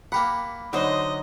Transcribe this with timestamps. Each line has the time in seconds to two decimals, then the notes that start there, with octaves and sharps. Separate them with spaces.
0.12 A#3 G4 F#5 B5
0.73 D3 F#3 D#4 C5 D#5